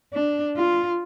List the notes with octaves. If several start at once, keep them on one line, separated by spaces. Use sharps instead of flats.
D4
F4